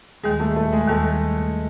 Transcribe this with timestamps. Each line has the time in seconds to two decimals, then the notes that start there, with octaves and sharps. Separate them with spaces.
0.23 D#2 D#3 G3 G#3 G#4
0.40 A3 A4
0.56 A3 A4
0.73 G#3 G#4
0.88 D#2 D#3 G3 A3 A4